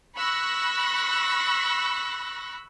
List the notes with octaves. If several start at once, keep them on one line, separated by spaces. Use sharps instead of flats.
B5 C#6 E6 F#6 A#6